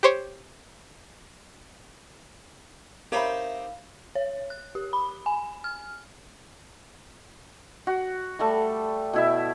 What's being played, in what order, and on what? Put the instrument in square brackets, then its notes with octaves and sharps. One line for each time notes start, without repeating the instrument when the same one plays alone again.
[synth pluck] G4 C5 C#5
[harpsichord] C4 D#4 G4 [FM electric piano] A#4 E5 [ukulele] C#5 B5 [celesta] F5
[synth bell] C#5
F#6
G4
B5
G#5
F6
[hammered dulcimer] F#4
G3 A3 A5 C#6
B2 E4 E5